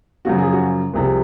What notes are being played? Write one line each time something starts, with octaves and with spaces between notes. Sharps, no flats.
F#2 C#3 F3 F#4
G#4
F#4
C2 C3 F3 G#4